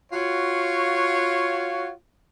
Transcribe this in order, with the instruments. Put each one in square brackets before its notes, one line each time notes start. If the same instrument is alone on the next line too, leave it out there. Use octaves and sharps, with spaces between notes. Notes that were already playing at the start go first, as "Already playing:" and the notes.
[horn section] F4 F#4 C#5